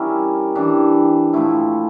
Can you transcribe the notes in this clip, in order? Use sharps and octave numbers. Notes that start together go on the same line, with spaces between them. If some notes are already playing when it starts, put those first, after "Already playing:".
Already playing: G3 C#4 E4 A#4
E3 G3 D4 G4
A#2 F3 A3 E4